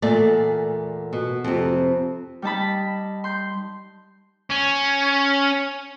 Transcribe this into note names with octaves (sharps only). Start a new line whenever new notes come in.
E2 A#2 A3 D5
B2
F2 C3
G3 D#4 A5 B5
C6 G6
C#4